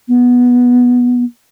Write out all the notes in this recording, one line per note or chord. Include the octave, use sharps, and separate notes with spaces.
B3